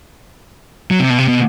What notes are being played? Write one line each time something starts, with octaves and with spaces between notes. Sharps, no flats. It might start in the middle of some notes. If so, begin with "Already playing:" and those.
F#3
C3
B2
C3
B2